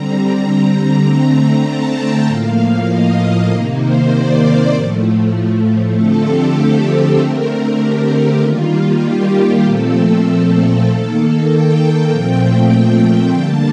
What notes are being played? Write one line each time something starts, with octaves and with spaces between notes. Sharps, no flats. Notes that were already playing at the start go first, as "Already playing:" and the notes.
Already playing: D3 G3 C4 A#5
A#5
D3 A3 C4 A#5
A5
G5
A2 F3 A#3 F5
D#5
C3 D#3 A#3
C5
D5
A2 F3 A3
D3 F3 A3 C4 A4
G4
A4
D3 A3 C4 A#4
G4
D#3 G3 A#3 F4
G4
A#2 F3 A3 C4 A4
D#3 A#3
G5
A#2 F3 A3 C4
D3 G3 A#3 A5